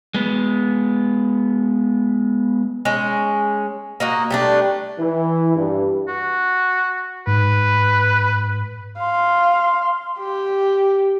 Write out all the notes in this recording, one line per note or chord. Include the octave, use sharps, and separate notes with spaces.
G#3 B3
G#3 C#4
A#3 D#4 F#4
G3 A3 D4
E3
G2
F#4
G#2 B4
F5 C6
G4